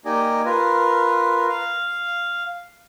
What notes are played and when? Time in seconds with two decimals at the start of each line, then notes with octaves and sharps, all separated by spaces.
0.05 A#3 D#4 G4 D5 D#5 G#5
0.45 F4 A#4 B4
1.49 F5